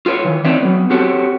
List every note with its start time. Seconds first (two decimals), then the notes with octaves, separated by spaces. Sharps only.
0.06 F4 A4 B4 C#5
0.24 D#3 E3
0.45 A3 C4 D#4 C#5 D5 E5
0.62 F#3 B3
0.90 C4 F#4 G4 A4 C#5